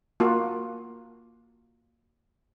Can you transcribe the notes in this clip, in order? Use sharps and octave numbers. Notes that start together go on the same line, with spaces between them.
A#3 F4 F#4